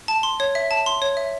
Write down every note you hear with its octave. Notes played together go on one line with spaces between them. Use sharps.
A5
C6
C#5
E5
A5
C6
C#5
E5